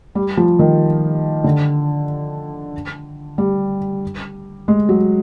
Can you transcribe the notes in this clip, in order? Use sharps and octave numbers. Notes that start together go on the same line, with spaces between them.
G3
F3
D#3
D3
G3
G#3
F#3